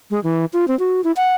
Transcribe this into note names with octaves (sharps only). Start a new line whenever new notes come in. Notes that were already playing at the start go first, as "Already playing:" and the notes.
G#3
E3
F4
C4
F#4
E4
F#5